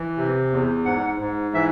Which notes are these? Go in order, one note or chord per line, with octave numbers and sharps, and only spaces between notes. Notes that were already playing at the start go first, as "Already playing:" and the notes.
Already playing: E3
C3
E2
G#2 F#5
G#2
E3 E5